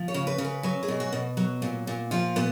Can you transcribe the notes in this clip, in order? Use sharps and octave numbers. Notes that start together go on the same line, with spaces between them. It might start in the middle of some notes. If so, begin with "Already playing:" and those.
Already playing: F3
C#5
C#3
B4
C#3
B4
F#3 B4
G#4
B2
F#4
B2
F#3
A#2
A#2
F3 F4
A#2 B3